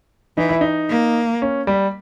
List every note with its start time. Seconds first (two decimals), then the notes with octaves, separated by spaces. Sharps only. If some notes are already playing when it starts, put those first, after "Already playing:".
0.37 E3 D#4
0.49 E4
0.61 D#4
0.89 A#3
1.42 C#4
1.67 G3